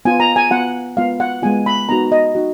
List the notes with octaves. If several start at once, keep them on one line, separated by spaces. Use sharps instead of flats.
B3 F4 G#5
A#5
G#5
B3 F4 F#5
G#3 B3 F4 F5
F#5
G#3 B3 F4 G#5
B5
B3 D#4 F#4 A#5
D#5
D#4 F#4